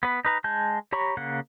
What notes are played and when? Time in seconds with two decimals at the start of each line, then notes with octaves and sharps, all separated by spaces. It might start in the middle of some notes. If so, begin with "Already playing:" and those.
0.03 B3 B4
0.25 D#4 B4 A#5
0.44 G#3 A5 G6
0.92 G4 C#5 A#5 B5 C#6
1.17 C#3 A#3 F#5